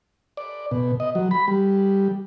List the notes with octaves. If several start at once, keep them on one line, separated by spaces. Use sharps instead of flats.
D5
B2
D#5
F#3
B5
G3